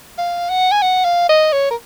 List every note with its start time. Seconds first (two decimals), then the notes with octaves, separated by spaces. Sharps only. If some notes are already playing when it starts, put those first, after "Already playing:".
0.18 F5
0.50 F#5
0.72 G#5
0.82 F#5
1.05 F5
1.29 D#5
1.53 C#5
1.71 A#4